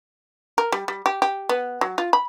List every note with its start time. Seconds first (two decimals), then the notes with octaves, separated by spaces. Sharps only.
0.58 A#4
0.72 G3
0.88 G3
1.06 G4
1.22 G4
1.49 B3
1.81 F#3
1.98 F4
2.13 B5